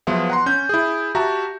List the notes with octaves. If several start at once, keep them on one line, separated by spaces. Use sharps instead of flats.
F3 F#3 B3 F4 G#4 E5
F#5 A#5 C6
C#4 G6
E4 G#4
F#4 G4 E5 A5 A#5